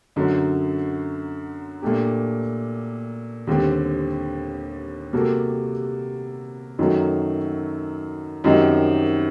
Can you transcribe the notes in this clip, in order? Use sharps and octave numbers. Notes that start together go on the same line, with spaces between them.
F#2 D3 F#3
A#2 A3 D4 G4
D#2 D3 G3 C4
C3 G3 A#3 F#4 A4
F#2 D#3 F#3 A3
F#2 D#3 G3 C4 D#4